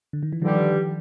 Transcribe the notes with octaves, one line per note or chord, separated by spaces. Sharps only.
D3
D#3
E3
G2 D3 D#3 F3 G3